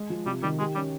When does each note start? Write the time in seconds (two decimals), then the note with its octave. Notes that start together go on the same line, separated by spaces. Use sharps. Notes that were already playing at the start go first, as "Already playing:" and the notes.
Already playing: G#3 G#4
0.10 F3
0.26 C3 G3
0.43 D#3 G3
0.59 G#3 G4
0.75 G3 C#4